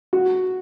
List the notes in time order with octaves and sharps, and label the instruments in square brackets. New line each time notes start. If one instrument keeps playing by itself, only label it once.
[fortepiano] F#4